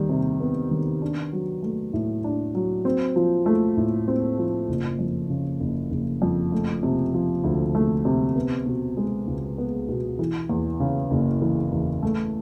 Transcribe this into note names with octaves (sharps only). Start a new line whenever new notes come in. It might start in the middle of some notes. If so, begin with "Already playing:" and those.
Already playing: D#3 G3
C3
B3
D#3
D4
F#3
A3
A2
D4
F#3
C4
F3
A3
A2
C4
F3
F#1
F2
C#3
F#1
F#1
F2
A3
C3
F3
D2
A3
C3
B3
B2
G#3
C#2
B3
B2
E3
E2
C#3
F#1
E3
E2
A3